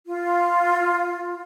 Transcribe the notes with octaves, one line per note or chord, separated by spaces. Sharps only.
F4